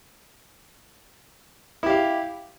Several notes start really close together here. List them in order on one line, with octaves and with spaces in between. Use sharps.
E4 G4 F5